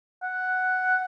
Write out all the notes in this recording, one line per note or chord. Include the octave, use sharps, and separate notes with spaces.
F#5